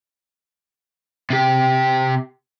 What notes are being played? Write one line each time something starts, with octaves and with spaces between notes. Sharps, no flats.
C3 G4